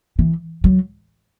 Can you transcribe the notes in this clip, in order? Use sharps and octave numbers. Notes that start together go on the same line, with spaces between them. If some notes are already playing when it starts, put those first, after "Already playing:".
E3
F#3